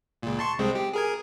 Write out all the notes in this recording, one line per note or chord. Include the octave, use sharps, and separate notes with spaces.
C#2 A#2
A5 C6 C#6
C2 G#3 C4
G4
G#4 A#4 G#5